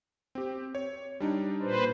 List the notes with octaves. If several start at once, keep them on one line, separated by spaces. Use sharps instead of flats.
C4 G4
C#5
G3 D4 D#4
A#2 B4 C5